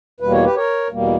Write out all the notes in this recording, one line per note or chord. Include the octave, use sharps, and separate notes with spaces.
E2 B2 G3 A#3 B4
C#5
G4 B4
A#4 C#5
E2 B2 G3 A#3